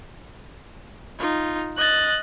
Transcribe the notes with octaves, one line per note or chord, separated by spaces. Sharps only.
D#4 F4
D#5 F#6 A6